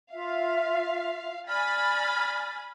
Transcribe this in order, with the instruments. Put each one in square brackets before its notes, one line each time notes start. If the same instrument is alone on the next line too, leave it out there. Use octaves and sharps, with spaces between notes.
[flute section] F4 E5 [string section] F5
[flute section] D5 F6 [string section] G#5 B5 A6